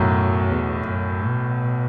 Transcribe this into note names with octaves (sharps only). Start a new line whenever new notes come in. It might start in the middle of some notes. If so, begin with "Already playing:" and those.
Already playing: B1 F#2 A2 F#3
E2
F#2
B2